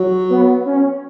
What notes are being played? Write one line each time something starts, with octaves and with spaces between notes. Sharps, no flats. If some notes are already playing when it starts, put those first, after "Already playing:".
Already playing: F#3
B3
C#4